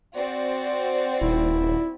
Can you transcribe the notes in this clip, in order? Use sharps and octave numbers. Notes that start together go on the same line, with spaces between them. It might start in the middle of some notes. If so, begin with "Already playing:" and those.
C4 F#4 D5
D#1 E4